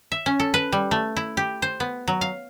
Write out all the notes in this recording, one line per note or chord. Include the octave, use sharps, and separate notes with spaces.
E5
C#4
A4
B4
G3
A3
E4
G4
C5
B3
F#3
F5